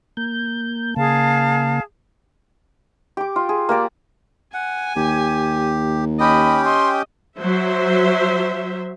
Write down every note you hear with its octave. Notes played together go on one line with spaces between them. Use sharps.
A#3 G6
C#3 A#3 G#4 F5 A5
G4 D6
F4
G#4
A#3 G4 D5
F#5 G#5
D#2 G4
C#4 G4 D#5 G5 B5
D#5 C6
F#3 C5 E5